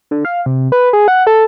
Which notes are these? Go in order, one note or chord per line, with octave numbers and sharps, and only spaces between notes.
D3
F5
C3
B4
G#4
F#5
A4